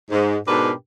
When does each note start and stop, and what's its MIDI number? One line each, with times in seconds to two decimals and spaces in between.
0.11 0.37 44
0.48 0.72 44
0.48 0.72 47
0.48 0.72 62
0.48 0.72 67
0.48 0.72 70
0.48 0.72 71